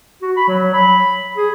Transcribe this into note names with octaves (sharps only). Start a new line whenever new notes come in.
F#4
B5
F#3
B5
G#4